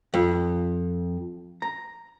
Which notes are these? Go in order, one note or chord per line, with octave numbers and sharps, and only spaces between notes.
F2
A#5